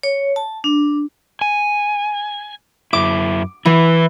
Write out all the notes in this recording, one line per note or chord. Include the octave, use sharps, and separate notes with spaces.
C#5
A5
D4
G#5
F#2 E4 D6
E3 E4 B4